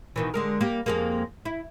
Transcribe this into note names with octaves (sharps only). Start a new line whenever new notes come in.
B2 D#3 E3
D3 G#3 A#4
G3 A#3
F2 G#3 A#3
E4